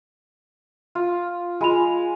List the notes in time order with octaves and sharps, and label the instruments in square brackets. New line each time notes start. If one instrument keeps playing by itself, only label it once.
[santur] F4
[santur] G#3 [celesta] F4 B5 F7